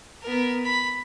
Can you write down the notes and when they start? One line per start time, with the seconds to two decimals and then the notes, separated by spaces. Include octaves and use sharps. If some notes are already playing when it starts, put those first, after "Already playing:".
0.21 B3 A#4
0.64 B5